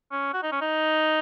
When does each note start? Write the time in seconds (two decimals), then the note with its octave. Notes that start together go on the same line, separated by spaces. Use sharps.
0.11 C#4
0.33 F#4
0.43 D#4
0.52 C#4
0.61 D#4